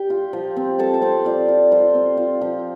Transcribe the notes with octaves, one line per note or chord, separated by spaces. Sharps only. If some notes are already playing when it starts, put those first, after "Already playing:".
Already playing: G4 G5
F4
F3
C4
C4 A4 A5
D6
C4 C5 C6
F4 D5 D6
F4
F4 C5 C6
C4
F4
F3